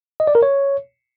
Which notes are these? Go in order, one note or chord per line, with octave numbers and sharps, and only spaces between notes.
D#5
D5
A#4
C#5